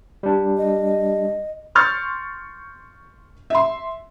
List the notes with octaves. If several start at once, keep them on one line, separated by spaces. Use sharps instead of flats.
G3 D4
D#5
C6 C#6 F6 G6 A6
E5 C6